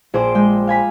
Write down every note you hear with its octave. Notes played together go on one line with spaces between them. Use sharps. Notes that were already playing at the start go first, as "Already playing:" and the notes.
A#1 G#4 C5 G5 D6
G#3 G5
F5 G#5 B5 B6